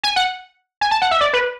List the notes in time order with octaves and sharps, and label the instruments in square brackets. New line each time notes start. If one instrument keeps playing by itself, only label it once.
[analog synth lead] G#5
F#5
G#5
A5
F#5
E5
D5
B4